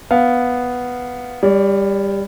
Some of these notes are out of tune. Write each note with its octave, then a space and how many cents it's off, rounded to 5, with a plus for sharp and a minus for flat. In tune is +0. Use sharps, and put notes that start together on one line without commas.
B3 +0 F5 +0
G3 +20 D5 -45